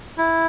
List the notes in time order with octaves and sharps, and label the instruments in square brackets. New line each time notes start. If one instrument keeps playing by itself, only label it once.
[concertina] E4